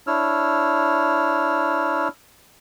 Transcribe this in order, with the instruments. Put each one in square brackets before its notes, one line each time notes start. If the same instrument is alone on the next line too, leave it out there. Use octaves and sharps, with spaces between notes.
[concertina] D4 E4 C#5 E6 F6